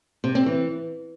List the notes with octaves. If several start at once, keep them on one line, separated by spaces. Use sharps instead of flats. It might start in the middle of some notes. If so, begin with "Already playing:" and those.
C3
C4
E3